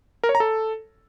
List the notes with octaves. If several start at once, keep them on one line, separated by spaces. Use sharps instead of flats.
A#4
C#5
A#5
A4